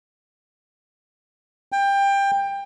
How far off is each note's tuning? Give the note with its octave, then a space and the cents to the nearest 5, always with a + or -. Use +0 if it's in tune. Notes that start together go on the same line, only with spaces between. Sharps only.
G5 +20